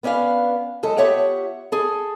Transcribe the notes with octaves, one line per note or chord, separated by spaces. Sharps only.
B3 C#4 D4 B4 F5
F#2 G#3 A4 D#5
B3 F4 G4 C#5 E5 F#5
G#4 A4